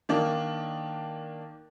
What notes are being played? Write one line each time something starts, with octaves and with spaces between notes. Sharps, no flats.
D#3 A#3 D4